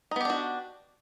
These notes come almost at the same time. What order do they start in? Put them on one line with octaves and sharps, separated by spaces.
D#4 B3 G4 D4 F#4